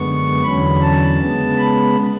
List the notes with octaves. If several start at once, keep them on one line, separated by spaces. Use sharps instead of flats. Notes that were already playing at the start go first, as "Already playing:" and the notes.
Already playing: F#2 D3 G#3 B3 C#6
E2 D3 F#3 C#4 B5
A5
C#3 G#3 B3
B5